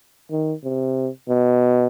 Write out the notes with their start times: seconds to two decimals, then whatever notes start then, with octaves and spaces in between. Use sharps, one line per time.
0.31 D#3
0.64 C3
1.29 B2